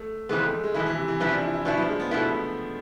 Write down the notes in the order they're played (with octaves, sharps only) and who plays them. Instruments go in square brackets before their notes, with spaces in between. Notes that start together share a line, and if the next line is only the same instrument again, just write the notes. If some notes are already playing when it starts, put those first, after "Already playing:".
Already playing: [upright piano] A3
[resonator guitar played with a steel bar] F2 C3 E3 B3 [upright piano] G#3
[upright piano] A3
A3
G#3
[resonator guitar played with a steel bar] B2 B3 E4 [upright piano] E3
[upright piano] E3
C3
E3
[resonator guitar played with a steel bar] B2 B3 E4 [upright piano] F3
[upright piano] D4
E4
E4
[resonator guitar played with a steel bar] B2 B3 E4 [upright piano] D4
[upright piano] F3
G#3
B3
[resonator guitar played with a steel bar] B2 B3 E4 [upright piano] A3